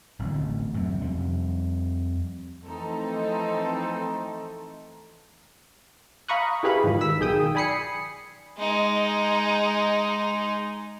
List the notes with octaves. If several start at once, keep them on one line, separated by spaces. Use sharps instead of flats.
D1 A1 D2
F#2 C3
F2 G3
E3 F3 A3 C4 D#4 A4
F5 A#5 B5 C#6 D#6 F#6
E4 G4 G#4 B4 F5 B5
G#2 D#3 F3
E6 B6
B1 D#3 G#4 G5 D#6
D5 G#5 B5 D#6 C7 C#7
G#3 D#4